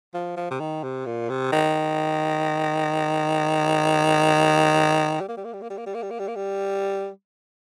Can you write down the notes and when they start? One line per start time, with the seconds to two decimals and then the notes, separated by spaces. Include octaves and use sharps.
0.14 F3
0.37 F3
0.51 C3
0.60 D#3
0.83 C3
1.06 A#2
1.30 C3
1.53 D#3
5.21 G3
5.29 A#3
5.37 G3
5.45 A#3
5.53 G3
5.62 A#3
5.70 G3
5.78 A#3
5.86 G3
5.94 A#3
6.02 G3
6.11 A#3
6.19 G3
6.28 A#3
6.36 G3